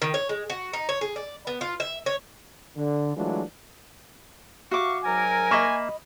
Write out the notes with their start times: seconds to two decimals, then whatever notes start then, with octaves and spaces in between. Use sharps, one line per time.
0.02 D#3
0.14 C#5
0.29 G#3
0.50 F#4
0.73 D#4
0.89 C#5
1.01 G#4
1.16 D5
1.47 B3
1.61 F4
1.80 E5
2.06 C#5
2.77 D3
3.17 E3 F#3 G#3 A3 D4 F4
4.71 F#4 E5 F5 C#6 D6
5.04 G#2 F#3 A#4 G#5
5.51 A#3 D#5 E5 B5 C#6